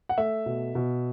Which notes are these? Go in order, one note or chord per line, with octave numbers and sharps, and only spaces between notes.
F#5
A3 E5
B2
B2